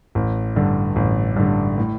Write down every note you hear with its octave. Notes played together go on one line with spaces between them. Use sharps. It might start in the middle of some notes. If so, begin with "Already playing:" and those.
A1
G2 D3
A1
G2 D3
A2